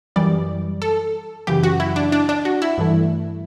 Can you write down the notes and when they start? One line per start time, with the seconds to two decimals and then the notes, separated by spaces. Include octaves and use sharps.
0.16 F#2 E3 G3 D5
0.82 A4
1.47 F#2 C#3 E3 G4
1.63 F#4
1.80 E4
1.96 D4
2.12 D4
2.29 D4
2.45 F#4
2.62 E4
2.78 G2 E3 A3